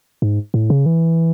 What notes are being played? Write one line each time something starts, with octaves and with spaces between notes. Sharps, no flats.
G#2
A2
C#3
E3